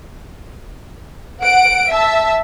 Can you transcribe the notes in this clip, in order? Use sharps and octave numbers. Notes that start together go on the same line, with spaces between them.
F#5 D7
E5 A5